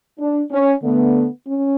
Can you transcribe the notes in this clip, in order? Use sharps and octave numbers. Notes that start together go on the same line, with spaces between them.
D4
C#4
D3 A3 B3
C#4